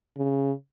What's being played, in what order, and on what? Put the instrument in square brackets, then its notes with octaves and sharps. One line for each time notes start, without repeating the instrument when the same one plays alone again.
[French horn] C#3